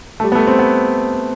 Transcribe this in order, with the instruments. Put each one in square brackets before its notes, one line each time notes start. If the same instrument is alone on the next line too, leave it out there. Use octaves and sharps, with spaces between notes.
[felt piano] A3
G3
B3
A3
C4
B3